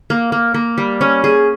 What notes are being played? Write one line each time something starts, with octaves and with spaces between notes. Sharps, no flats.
A#3
A#3
A#3
G3
C#4
G#4